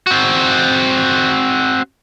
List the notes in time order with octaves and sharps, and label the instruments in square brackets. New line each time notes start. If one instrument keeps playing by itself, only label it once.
[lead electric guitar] C4 F#4